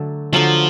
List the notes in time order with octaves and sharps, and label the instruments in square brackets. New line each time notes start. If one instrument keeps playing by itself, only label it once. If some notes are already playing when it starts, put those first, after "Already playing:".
Already playing: [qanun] D3 F#3 A3
[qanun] D3 F#3 A3 [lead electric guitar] F3